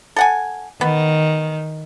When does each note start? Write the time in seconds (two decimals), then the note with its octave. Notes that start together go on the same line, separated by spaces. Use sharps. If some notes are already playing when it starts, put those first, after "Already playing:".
0.16 A4 F#5 G#5
0.81 D#3 B3